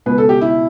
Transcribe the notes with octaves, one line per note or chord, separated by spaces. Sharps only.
C#2 B2 B4
A4
G4
E4